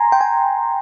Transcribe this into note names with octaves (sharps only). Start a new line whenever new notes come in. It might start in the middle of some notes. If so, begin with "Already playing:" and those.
Already playing: G#5 A#5 C6
G5
G#5